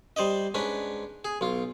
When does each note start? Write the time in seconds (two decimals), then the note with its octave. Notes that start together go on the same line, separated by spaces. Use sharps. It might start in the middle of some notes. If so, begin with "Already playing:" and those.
0.16 G3 C5 D5 D#5
0.54 G#2 C#4 D4 B4
1.25 G#4
1.41 B1 F4